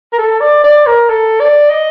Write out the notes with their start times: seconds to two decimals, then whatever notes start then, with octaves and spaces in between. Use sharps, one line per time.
0.13 A#4
0.18 A4
0.41 D5
0.64 D5
0.86 A#4
1.09 A4
1.40 D5
1.70 D#5